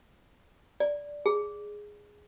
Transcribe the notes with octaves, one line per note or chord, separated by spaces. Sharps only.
D5
G#4